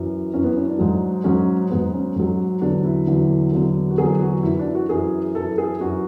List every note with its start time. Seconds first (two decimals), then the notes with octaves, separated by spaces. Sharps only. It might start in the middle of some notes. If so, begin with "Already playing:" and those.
Already playing: F#2 E3
0.33 F#2 E3 C#4
0.44 B3
0.56 C#4
0.68 D4
0.78 G#2 F#3
1.24 G#2 F#3 C#4
1.71 G#2 F#3 B3
1.93 C#4
2.16 G#2 F#3
2.61 E2 D3 F#3 D4
2.85 E4
3.07 E2 D3 F#3
3.53 E2 D3 F#3
3.90 F#4
3.98 E2 D3 F#3 G#4
4.21 F#4
4.43 F#2 E3 E4
4.59 D4
4.75 F#4
4.89 F#2 E3 G#4
5.35 F#2 E3 A4
5.58 G#4
5.80 F#2 E3 F#4